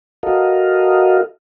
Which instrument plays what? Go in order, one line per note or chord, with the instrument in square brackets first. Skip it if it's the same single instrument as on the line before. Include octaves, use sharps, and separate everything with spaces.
[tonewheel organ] F#4 A4 A#4 D#5 F5